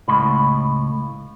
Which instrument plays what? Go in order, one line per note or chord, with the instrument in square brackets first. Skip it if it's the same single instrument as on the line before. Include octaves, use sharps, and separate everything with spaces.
[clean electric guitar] C#2 A2 B5